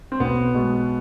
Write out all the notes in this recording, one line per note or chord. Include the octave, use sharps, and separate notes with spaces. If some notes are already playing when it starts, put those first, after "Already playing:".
C4
B1 B3
B2 G#3